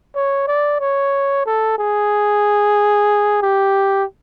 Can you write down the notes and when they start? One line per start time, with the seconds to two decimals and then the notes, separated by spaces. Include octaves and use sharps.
0.15 C#5
0.48 D5
0.80 C#5
1.46 A4
1.79 G#4
3.42 G4